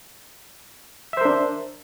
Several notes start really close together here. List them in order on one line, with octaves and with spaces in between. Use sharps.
E5 C5 A#4 D4